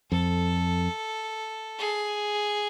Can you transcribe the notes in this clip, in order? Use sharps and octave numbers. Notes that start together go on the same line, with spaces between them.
F2 A4
G#4